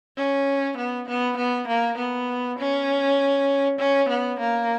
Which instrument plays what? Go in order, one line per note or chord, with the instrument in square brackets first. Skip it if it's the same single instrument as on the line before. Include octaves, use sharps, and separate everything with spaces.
[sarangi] C#4
B3
B3
B3
A#3
B3
C#4
C#4
B3
A#3